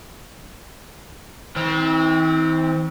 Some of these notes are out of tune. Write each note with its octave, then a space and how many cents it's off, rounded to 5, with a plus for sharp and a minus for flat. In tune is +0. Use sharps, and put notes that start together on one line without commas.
E3 -45 C4 +0